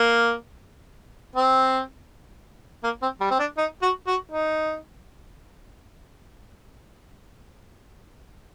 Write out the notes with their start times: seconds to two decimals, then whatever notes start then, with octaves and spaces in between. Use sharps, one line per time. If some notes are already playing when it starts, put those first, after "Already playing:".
Already playing: A#3
1.36 C4
2.84 A#3
3.02 C4
3.20 G3
3.31 C4
3.39 D4
3.58 D#4
3.82 F#4
4.07 F#4
4.32 D#4